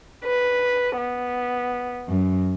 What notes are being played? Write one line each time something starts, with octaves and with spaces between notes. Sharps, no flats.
B4
B3
F#2